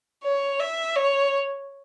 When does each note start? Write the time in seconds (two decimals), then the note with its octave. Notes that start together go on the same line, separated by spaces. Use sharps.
0.24 C#5
0.60 E5
0.95 C#5